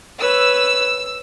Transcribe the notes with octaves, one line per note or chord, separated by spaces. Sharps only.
B4 C#5 E6